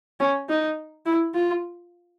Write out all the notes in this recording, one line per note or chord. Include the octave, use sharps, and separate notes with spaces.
C#4
D#4
E4
F4